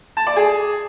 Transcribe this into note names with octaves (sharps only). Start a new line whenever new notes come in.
A5
D5
G#4